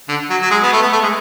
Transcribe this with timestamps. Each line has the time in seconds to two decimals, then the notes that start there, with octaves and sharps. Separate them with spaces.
0.09 D3
0.30 F#3
0.41 F#3
0.50 G#3
0.63 B3
0.72 A3
0.82 B3
0.92 A3
1.03 G#3